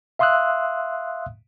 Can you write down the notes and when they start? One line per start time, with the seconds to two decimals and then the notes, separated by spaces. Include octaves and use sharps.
0.19 E5 F5 C6 D#6 E6 F#6